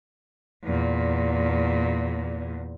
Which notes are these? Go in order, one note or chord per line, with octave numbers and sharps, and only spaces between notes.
E2 A#2